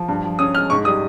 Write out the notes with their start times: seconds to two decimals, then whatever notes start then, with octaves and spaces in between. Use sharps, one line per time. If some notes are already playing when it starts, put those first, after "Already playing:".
Already playing: F3
0.08 G2
0.24 F3
0.39 C#4 D#6
0.55 G#3 F6
0.70 G#2 C#6
0.85 G3 D#6